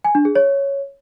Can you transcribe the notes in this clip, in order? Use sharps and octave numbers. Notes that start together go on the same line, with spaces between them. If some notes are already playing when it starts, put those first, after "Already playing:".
G#5
D4
G#4
C#5